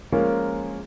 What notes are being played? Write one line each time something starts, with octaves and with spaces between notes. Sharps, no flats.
F3 G#3 A#3 C#4 F4 A#4